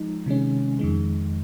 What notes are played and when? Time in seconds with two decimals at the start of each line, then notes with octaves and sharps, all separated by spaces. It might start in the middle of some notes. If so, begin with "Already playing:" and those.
Already playing: F3 G#3 D#4
0.26 C3 D#3 G#3 C#4
0.79 F2 D#3 G#3